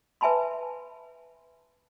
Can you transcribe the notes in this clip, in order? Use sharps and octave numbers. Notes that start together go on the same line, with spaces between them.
B4 E5 G#5 A5 B5 C6